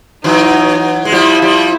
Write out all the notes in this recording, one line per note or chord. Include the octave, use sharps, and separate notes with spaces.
E3 F#3 D#4
G#3
F3 G3 E4
F3 G3